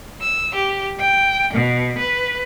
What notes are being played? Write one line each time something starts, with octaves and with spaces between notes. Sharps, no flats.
E6
G4
G5
B2
B4